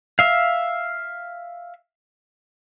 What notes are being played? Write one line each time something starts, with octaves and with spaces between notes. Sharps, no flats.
E5 F5